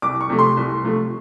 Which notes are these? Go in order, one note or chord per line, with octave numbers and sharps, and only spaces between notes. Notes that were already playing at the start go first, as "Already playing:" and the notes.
C2 D6
C#6
C3 F3 A3
C6
C2
C3 F3 A3